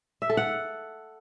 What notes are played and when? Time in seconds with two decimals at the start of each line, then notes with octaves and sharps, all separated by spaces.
0.22 E5
0.30 A4
0.37 F#5